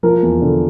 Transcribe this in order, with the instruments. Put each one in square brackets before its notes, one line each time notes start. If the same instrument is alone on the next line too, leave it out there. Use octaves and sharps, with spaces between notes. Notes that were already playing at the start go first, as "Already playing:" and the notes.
[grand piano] F3 A#4
E2
D3